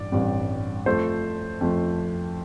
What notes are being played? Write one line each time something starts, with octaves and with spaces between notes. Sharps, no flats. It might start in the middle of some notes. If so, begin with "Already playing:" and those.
Already playing: A1 G2 G3 D5
A1 G2 G3 C4
F2 F3 A3 C5
F2 F3 A3